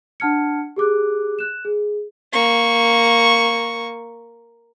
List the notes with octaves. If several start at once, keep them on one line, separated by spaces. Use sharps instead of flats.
D4 F#5 A5 F6 G#6 C#7
G4 G#4 D6 F#6
F#6 E7
G#4
A#3 C#6